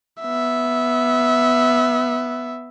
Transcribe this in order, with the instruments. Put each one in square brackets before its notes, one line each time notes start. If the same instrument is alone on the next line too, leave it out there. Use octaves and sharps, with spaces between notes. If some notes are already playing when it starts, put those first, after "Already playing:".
[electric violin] B3 E5